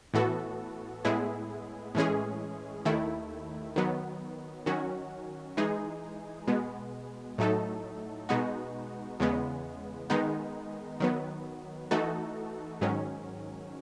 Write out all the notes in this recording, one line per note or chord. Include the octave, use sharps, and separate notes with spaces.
A2 E3 B3 F#4 A4
A2 G#3 B3 E4 G#4
A2 E3 G#3 C#4 G#4
D#2 D#3 A3 E4
D#3 F#3 B3
D#3 F#3 C#4 F#4
E3 G#3 D#4 G#4
B2 G#3 B3
A2 F#3 A3 D#4 A4
B2 G#3 B3 D#4 F#4
E2 C#3 G#3 B3
D#3 G#3 B3 D#4
D#3 F#3 B3
E3 A3 D#4 F#4 A4
G#2 D#3 F#3 C#4